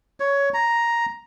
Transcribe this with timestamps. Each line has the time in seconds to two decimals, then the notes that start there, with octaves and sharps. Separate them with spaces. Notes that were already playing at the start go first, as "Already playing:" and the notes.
0.20 C#5
0.54 A#5